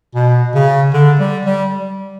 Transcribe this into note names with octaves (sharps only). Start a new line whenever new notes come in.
B2
C#3
D3
G3
G3